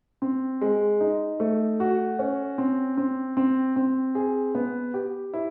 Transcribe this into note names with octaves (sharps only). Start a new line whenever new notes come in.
C4
G#3
D#4
A3
F#4
C#4
C4
C4
C4
C4
G#4
B3
G4
E4